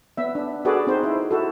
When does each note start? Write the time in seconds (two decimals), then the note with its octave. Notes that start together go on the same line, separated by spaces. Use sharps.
0.17 B3 E5
0.35 D4
0.65 F#4 G#4 A4 B4 D5
0.87 C4 D#4 C5
1.03 E4
1.31 E4 F#4 A4